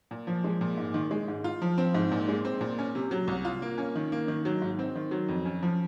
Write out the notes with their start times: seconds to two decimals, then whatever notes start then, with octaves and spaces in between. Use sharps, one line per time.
0.11 A#2
0.27 F3
0.44 G#3
0.61 A#2
0.78 G#2
0.94 D#3
1.11 G#3
1.28 G#2
1.44 F4
1.62 F3
1.78 C4
1.94 G#2
2.11 A#2
2.28 G#3
2.45 C4
2.61 A#2
2.79 C#4
2.95 C3
3.11 F#3
3.28 C2
3.45 F4
3.62 A#3
3.78 C#4
3.96 D#3
4.12 A#3
4.28 D#3
4.45 F#3
4.62 G#2
4.79 C4
4.95 D#3
5.11 F#3
5.28 F2
5.45 C#4
5.63 F3